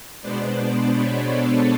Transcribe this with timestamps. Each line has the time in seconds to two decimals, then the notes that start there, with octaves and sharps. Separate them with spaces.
0.22 B2 G#3 B3 D4 C5 D5
0.93 B4 C#5
1.28 A4 B4